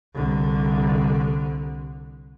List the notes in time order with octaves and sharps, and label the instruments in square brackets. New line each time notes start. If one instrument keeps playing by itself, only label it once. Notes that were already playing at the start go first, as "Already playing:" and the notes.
[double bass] C2 D3